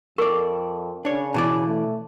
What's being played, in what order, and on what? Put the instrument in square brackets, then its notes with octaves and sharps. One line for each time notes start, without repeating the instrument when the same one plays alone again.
[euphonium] F2 [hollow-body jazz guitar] A4 D5 [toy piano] A#4 C#6
[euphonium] C#3 [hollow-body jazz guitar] D4 C#5
[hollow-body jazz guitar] B2 E3 D5 [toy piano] A5
[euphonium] A3